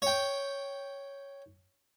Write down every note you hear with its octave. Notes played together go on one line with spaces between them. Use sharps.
C#5 G5